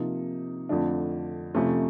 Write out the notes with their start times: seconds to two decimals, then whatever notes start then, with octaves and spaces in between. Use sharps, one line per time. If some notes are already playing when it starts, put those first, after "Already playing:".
Already playing: C3 F3 A#3 D#4
0.69 F2 D3 F3 A3 D4
1.55 F2 C3 F3 A3 C#4